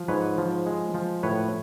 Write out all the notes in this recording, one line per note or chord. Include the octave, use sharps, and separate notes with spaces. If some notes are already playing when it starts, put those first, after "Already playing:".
Already playing: F3
G#2 B4 C#5
F3
G#3
F3
A2 B4 C#5